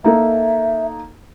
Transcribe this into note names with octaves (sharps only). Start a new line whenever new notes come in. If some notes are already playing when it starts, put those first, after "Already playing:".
A#3 D#4 A4 E5